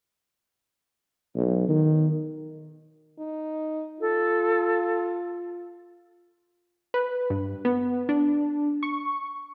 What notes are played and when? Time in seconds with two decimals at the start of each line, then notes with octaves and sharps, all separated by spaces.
1.36 B1
1.69 D#3
3.19 D#4
4.01 F4 A4
6.94 B4
7.30 G2
7.65 B3
8.09 D4
8.83 C#6